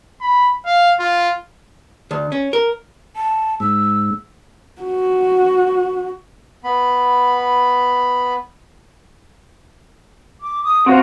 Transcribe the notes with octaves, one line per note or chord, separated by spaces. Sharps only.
B5
F5
F4
D2
C#4
A#4
A5
G#2 E6
F#4
B3 B5
D6
D#6
C3 C4 F4 F#4